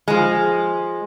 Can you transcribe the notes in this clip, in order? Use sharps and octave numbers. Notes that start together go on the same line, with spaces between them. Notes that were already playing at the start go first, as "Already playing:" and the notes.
F3 G#3